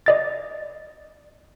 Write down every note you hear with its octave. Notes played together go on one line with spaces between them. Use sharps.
D5 D#5 A6